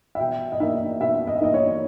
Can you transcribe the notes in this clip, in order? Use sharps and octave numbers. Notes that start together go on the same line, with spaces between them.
E5
B2 G5
D#5
A#3 D#4 E5
B2 E5
D#5
E5
A#3 D#4 D#5
C#5